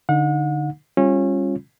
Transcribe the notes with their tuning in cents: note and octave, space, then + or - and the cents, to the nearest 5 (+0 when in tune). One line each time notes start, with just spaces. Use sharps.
D3 +0 D#4 +0 F#5 -40
G3 +25 C#4 -25 F4 +0